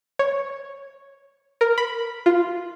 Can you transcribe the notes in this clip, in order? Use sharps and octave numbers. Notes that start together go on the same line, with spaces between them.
C#5
A#4
B5
F4